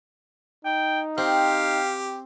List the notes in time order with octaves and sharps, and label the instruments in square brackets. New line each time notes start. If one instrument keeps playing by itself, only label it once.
[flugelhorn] D#4 [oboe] G5
[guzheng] C4 [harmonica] G4 [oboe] F5